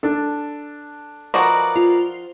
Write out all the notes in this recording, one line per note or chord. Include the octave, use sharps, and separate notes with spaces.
D4 A4
F3 D#4 F#4 A#4 B4 D5
F4